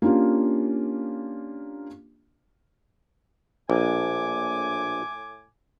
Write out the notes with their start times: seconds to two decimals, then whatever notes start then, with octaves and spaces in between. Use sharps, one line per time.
0.02 A#3 C#4 D4 F4 G4
3.70 A#1 A2 G#5 D6